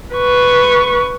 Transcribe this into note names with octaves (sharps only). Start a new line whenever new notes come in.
B4 C#6